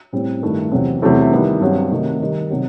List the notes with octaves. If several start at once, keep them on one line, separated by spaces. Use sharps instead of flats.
A2 G3 C4
G2 D#3 A3 E4
E2 C3 F#3 C4
E2 C3 F#3 A3 E4
D#3 G3 B3 E4
G2 F#3 C4
C3 D#3 A3 D#4
D#3 G3 D#4
C3 F#3